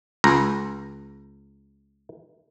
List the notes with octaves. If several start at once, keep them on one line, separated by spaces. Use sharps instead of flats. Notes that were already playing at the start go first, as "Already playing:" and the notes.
C#2 A#5